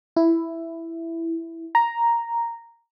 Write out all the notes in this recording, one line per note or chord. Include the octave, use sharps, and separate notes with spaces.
E4
A#5